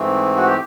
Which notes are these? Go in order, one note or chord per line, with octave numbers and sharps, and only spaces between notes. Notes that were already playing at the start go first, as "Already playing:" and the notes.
Already playing: G#2 E3 A3 C4
F#4
G4